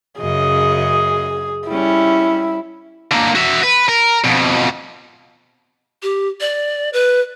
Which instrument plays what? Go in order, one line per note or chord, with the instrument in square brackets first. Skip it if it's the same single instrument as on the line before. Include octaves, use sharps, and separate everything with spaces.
[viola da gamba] F#2 C#3 D#5 [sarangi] G#4
[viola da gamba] G3 C#4 [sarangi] E4
[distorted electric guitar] D3 A#3
F#4 E5
B4
A#4
F2 B2
[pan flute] G4
D5
B4